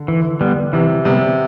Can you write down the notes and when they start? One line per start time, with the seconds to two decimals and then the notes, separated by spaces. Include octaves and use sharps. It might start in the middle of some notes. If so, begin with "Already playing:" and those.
Already playing: D3
0.08 E3
0.41 G3 B3
0.73 C3 E3
1.05 C3 G3 B3